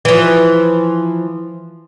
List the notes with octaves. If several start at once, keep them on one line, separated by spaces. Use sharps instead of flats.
E3 F3